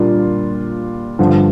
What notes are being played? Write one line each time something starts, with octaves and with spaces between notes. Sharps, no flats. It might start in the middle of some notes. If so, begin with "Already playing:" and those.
Already playing: A#2 G3 A#3 D4 F4
G2 D3 F3